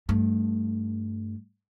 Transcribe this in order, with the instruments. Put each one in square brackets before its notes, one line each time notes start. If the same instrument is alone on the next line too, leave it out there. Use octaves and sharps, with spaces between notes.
[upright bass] G2 A3